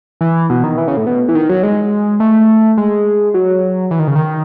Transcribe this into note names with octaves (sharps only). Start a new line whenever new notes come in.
E3
B2
D#3
E3
C#3
A2
B2
E3
D#3
F#3
G#3
A3
G#3
F#3
E3
D#3
C#3
D#3